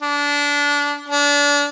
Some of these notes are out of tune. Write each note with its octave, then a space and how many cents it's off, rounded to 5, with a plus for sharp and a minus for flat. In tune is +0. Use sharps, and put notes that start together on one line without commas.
D4 -25
D4 -30